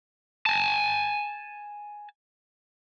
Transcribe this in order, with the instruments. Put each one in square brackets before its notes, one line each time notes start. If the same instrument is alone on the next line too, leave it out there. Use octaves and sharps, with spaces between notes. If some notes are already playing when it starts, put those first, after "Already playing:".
[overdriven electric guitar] G#5 A5